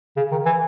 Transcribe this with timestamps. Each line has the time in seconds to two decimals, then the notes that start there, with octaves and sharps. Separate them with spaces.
0.17 C#3
0.31 D#3
0.46 E3